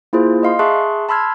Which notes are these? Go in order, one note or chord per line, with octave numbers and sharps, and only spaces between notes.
A#3 E4 F4 G#4 C5
D#5 F5 C6
G#4 E5 A5 C6 C#6 F#6
A5 B5 C6 E6 F6 G#6